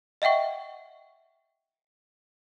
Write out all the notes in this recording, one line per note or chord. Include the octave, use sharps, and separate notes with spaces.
D#5 E5 F#5 G5 C#6